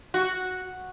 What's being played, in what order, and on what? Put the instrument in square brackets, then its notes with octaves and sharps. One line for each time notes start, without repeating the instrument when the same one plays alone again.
[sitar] F#4